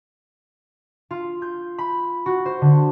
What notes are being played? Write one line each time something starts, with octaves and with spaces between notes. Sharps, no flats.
F4
G6
B5
F#4
C5
D3